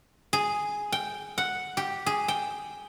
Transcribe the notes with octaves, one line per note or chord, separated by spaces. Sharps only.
G#4
G5
F#5
G4
G#4
G5